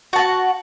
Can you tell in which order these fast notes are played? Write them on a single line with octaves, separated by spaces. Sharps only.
F#4 A5 F#5